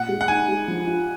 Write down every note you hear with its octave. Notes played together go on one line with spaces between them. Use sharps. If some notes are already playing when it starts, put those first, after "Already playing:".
Already playing: A#2 F#5
G#3
F#5
D#4 G#5
G#3
F3
F4